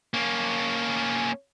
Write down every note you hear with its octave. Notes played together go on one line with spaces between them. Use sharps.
A#3 C#4